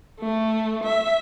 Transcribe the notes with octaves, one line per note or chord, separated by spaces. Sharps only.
A3
E5